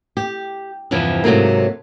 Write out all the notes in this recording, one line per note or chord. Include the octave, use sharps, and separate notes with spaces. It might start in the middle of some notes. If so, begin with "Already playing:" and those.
G4
E2 G2 C3 E3 F3
G#2 C3 F#3 A3 A#3